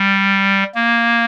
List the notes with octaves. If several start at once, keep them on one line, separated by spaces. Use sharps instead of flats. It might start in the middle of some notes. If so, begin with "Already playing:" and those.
Already playing: G3
A#3